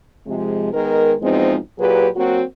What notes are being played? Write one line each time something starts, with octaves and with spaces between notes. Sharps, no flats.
C3 F3 G#3
D#3 G#3 B3 A#4
E2 B2 F3 G#3 C4 D#4
A#2 F#3 G4 G#4 B4
F#3 A#3 C4 F#4